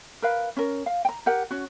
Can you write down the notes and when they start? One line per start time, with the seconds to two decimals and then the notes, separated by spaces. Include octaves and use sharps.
0.22 A#4 B4 F5
0.57 C#4 A#4
0.86 F5
1.05 G5 A#5
1.26 G4 A#4 F#5
1.51 C#4 F#4